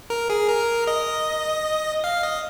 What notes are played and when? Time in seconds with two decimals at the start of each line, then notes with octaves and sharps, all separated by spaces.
0.10 A#4
0.30 G#4
0.49 A#4
0.87 D#5
2.04 F5
2.23 D#5